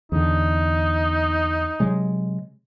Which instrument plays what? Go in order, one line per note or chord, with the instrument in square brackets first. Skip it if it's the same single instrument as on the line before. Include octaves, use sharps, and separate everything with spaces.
[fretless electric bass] E2 D3 [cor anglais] D#4
[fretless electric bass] C3 F#3 G#3